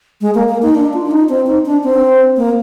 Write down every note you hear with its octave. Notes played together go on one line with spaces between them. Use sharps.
G#3
A#3
A#3
D#4
D4
F4
D4
D#4
C4
D#4
D4
C4
A#3